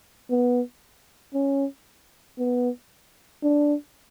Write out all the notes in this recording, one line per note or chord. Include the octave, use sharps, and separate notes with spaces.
B3
C#4
B3
D4